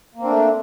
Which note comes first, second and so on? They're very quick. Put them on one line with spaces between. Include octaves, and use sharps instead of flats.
A#3 C4 D4 A3